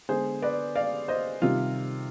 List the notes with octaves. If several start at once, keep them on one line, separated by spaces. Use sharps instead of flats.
D3 G#3 B3 G#4 C5
B4 D5
D5 F5
C5 D#5
C3 D#3 G3 F4